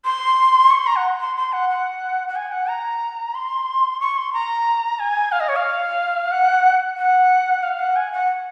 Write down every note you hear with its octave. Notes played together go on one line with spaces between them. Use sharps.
C6
C#6
C6
A#5
F#5
C6
C6
F#5
F#5
F#5
G#5
F#5
A#5
C6
C#6
C6
A#5
G#5
F5
D#5
C#5
F5
F#5
F#5
F5
F#5
G#5
F#5